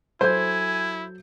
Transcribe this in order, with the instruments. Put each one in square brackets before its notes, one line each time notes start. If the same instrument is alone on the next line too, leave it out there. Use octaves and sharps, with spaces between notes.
[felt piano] F#3 A4 G6 [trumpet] E4 [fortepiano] C5 [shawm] G#5